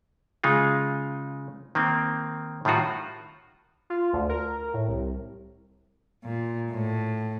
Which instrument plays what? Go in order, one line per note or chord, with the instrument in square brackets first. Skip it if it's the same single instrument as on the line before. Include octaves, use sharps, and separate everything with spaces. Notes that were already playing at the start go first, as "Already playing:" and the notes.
[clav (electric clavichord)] C#3 G#3 D#4 F4
D#3 A#3 C4
A2 D#3 G3 F4 F#4
[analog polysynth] F4
D2
A#4
A2
C2
[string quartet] A#2
A2